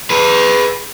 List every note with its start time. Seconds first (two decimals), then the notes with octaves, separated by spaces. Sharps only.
0.10 G#4 B4